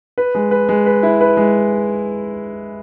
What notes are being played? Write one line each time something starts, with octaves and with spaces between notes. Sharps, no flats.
B4
G#3
B4
G#3
B4
E4
B4
G#3